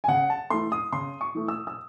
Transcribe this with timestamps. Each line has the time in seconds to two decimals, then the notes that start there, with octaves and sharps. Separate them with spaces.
0.04 G#5
0.08 C#3 F#5
0.30 A5
0.50 E3 A3 C6
0.72 D#6
0.92 C#3 C6
1.21 C#6
1.35 E3 A3
1.48 E6
1.67 E6